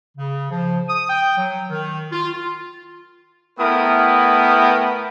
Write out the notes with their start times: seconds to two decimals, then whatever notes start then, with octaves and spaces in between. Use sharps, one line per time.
0.16 C#3
0.51 F3
0.88 D#6
1.09 G5
1.37 F#3
1.69 D#3
2.12 F4
2.33 F4
3.59 A3 B3 E4 A#4 G5 D#6